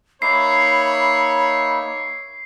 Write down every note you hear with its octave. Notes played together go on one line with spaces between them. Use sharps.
A#3 D#4 C#5 E5 B5 C7